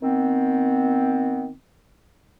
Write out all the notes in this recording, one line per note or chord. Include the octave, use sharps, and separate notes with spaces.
D#3 B3 C4